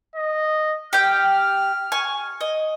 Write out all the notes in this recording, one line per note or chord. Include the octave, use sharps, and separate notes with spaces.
D#5
G4 G5 F6
G#5 C#6
D#5